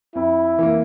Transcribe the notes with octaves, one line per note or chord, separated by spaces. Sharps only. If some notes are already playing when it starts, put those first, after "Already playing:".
F2 E4
E3 A#3